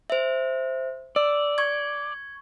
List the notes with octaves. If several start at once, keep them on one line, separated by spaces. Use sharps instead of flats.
C5 E5
D5 E6
C#6 G#6